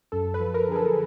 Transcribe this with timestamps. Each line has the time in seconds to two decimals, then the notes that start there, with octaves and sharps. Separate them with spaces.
0.12 F#2 A4
0.34 B4
0.40 F3
0.54 A#4
0.69 D3 G#4
0.76 A4